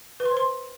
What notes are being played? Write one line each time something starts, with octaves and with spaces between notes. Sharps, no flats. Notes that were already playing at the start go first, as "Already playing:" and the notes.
B4
C6
C5
C6